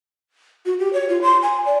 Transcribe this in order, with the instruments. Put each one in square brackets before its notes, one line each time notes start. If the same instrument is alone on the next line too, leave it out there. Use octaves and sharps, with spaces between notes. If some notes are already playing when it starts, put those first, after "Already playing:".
[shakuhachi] F#4
G4
C#5
F4
C6
G#5
D5